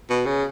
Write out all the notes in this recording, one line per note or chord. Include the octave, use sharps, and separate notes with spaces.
B2
C#3